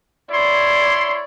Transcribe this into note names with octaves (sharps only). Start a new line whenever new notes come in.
E4 C#5 D5 C6